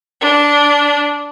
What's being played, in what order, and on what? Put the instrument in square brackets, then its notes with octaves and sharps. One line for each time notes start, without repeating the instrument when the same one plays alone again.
[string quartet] D4